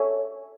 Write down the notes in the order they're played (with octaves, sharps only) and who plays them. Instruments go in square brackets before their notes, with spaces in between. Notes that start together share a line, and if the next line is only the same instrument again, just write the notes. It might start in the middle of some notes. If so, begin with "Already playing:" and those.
Already playing: [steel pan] A4 C#5 E5 G#5